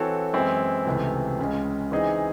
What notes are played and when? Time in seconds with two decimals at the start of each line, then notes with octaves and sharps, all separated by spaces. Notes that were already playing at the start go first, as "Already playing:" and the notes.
Already playing: E3 C4 F#4 A4 C#5
0.33 F#2 E3 G#3 C4 E4
0.86 C#2 C3 E3 A3 C4
1.39 C#2 C#3 G#3
1.91 E3 C4 D#4 G#4 D#5